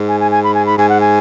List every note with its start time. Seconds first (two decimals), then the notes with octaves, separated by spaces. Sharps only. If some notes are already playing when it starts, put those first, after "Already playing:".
Already playing: G#2
0.08 G#5
0.20 G#5
0.31 G#5
0.44 B5
0.54 G#5
0.66 B5
0.78 G#2 G#5
0.89 F#5
1.01 G#5